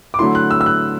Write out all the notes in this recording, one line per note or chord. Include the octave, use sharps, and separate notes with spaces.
D6
D3 F#3 A3 E4 C6
F#6
E6
E6
F#6